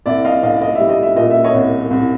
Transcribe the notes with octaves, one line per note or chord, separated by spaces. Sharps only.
C2 D5 E5
D#5 F5
C2 D#5 F5
D#5
G3 E5
D#5
E5
A#2 D#5
E5
C#5 D#5
C2
C2